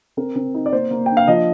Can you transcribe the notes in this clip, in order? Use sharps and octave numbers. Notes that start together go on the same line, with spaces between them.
C4 A#4
C4
D#4
D5
A#3 C5
A#3
D4 G5
F5
F3 D#5